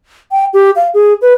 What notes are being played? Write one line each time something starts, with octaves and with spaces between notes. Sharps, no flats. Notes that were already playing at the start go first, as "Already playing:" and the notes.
G5
G4
F5
G#4
B4